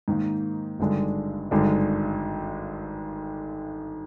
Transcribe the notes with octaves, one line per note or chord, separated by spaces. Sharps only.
G#2 D#3 A#3
G#1 G2 D3 G#3 D4
G#1 G2 D3 G#3 D4